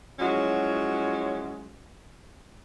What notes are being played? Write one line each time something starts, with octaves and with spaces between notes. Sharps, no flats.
F3 F#3 G#3 C#4 E4 F#4